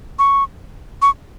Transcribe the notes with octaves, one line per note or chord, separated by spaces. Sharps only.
C#6
C#6